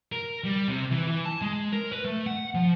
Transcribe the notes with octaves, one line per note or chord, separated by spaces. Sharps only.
A#4
G3
C3
E3
E3
A5
G#3
A#4
B4
A3
F#5
F3